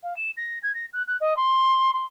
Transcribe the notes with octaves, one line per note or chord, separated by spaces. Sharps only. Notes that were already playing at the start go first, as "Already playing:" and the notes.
F5
E7
A#6
G#6
A#6
F#6
F#6
D#5
C6
C6